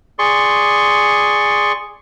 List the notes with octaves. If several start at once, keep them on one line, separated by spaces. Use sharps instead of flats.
G#4 D5 C6 C#6